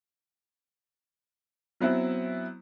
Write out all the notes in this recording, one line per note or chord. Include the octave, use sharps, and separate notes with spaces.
F#3 B3 C4 E4